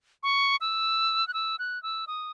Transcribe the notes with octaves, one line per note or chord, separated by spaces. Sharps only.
C#6
E6
F#6
E6
F#6
E6
D#6